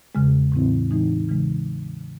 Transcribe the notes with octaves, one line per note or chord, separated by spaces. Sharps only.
E2 C#3 G#3
A2 E3 C4 E4
A2 E3 G#3 D#4
C#3 E3 G#3